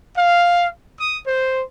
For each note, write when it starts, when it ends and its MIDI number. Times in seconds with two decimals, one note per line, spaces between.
0.16 0.68 77
0.98 1.20 87
1.26 1.62 72